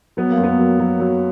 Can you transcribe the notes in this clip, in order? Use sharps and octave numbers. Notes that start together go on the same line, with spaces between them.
F#3 B3
A#3
F#2
B3
F#3
F#3
F#3